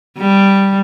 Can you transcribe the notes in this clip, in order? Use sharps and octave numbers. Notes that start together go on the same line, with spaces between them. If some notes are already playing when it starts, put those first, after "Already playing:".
G3